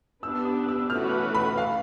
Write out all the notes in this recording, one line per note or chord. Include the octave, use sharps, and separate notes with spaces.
B3 D4 G4 B4 E6
D#6
E6
E3 A3 C#4 F#4 B4 F6
B5
F5